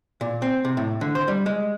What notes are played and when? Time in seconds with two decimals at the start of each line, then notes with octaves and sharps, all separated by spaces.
0.21 A#2
0.42 C4
0.65 C3
0.77 A2
1.01 D3
1.15 C5
1.28 G3
1.46 G#3